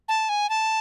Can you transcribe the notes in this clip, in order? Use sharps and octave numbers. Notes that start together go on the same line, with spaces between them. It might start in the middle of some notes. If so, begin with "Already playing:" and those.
A5
G#5
A5